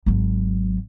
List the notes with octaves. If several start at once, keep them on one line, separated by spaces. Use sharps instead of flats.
G#1 F#3